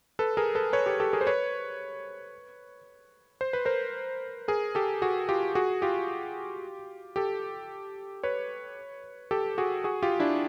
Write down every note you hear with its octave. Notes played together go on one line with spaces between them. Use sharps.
A4 B4
G#4 A#4
A4 B4
B4 C#5
G4 A4
G4 A4
G#4 A#4
C5
B4 C#5
C5
B4
A#4 C5
G#4 A#4
G4 A4
F#4 G#4
F4 G4
F#4 G#4
F4 G4
G4 A4
B4 C#5
G4 A4
F#4 G#4
F#4 G#4
F4 G4
D4 E4